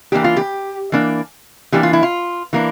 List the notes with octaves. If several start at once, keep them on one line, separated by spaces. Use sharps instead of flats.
E3 A#3 D4 G4
F4
G4
E3 A#3 D4
E3 A#3 D4 G4
F4
E4
F4
E3 A#3 D4